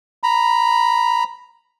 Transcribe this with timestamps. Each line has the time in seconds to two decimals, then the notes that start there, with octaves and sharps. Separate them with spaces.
0.23 A#5 B5